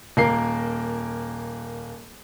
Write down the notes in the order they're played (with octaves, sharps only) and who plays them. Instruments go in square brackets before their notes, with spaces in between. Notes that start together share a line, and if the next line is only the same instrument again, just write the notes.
[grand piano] D#1 A#3 A#4 C7